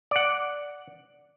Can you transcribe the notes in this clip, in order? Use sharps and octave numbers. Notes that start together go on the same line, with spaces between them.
D5 F#5